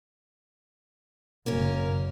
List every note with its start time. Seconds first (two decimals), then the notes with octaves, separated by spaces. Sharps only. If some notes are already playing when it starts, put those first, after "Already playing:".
1.46 F#1 A#3 C#4 A#4